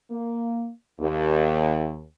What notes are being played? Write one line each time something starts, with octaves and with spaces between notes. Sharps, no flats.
A#3
D#2